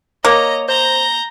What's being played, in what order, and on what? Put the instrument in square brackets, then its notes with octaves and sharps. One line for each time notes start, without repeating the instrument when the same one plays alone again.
[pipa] A#3 [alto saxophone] C#5 [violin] D#5 A#5
[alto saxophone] C5 [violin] A#5 G6